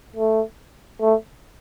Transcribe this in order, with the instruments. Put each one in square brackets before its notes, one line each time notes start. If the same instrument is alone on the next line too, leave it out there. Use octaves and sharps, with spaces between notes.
[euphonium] A3
A3